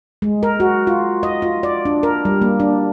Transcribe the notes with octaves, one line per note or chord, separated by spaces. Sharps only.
G#3
A#4
F#4
F4
D#5
F4
D5
D4
A#4
G3
A#3
D4